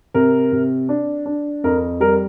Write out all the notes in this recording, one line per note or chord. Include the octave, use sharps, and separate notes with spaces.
C3 A#4
C3
D4
D4
F2 A#4
G3 A#4